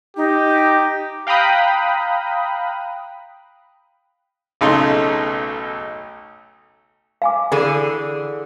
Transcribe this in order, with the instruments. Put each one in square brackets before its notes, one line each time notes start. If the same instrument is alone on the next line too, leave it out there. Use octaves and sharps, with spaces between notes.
[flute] D#4 [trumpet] G4
[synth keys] F5 G5 A#5 B5 D#6 F#6
[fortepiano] B1 C#3 A3 D#4 C6
[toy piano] F5 G#5 D6
[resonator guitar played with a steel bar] D3 E3 G#4 [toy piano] A4